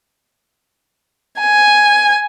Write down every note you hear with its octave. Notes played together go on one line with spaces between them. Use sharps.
G#5